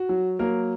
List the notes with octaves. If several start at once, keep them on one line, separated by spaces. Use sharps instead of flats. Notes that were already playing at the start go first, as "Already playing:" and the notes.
Already playing: F#4
F#3
F#3 A#3 A#4